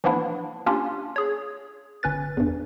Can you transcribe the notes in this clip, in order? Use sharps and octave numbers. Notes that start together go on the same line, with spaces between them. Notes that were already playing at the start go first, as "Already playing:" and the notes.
E3 F3 A#3 B3 D4 E4
A#3 C#4 D4 F4 G4
G#4 C#5
G1 C#4 B4 A6
E2 G2